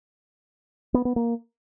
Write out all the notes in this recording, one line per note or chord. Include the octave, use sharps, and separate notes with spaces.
B3
B3
A#3